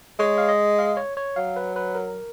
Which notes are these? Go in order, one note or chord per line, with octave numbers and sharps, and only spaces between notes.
G#3 C#5
F5
D#5
F5
C#5
C#5
F#3 F5
B4
B4
A#4